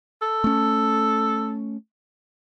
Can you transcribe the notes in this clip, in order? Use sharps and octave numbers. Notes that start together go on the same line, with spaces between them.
A4
A3 C#4